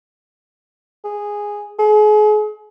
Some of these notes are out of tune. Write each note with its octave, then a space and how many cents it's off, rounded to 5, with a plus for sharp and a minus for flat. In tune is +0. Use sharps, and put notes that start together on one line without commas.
G#4 -5
G#4 +35